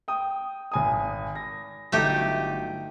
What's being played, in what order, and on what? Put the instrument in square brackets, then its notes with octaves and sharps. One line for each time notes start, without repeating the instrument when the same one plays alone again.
[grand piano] G5 D#6
G#1 G#5 D#6
A#6
[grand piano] G1 F#3 [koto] A3 D#4 G4